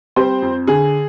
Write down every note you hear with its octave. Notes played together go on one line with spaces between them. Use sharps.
G3 C4 C5
F2
D3 G#4